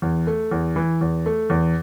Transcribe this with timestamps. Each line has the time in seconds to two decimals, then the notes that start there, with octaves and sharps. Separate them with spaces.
0.02 E2
0.27 A3
0.51 E2
0.76 E3
1.01 E2
1.26 A3
1.50 E2